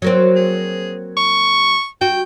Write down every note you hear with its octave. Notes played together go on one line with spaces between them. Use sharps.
F#3 A#3 C4
G#4
C#6
F#4 G5